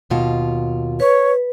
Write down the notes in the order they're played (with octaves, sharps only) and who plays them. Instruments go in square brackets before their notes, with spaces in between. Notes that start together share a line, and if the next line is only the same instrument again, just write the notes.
[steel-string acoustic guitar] D#2 B2 F4
[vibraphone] B4 [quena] C#5